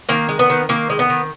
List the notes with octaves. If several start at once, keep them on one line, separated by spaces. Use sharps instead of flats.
D#3 A#3
G#3
B3
D#3
D#3 A#3
G#3
B3
D#3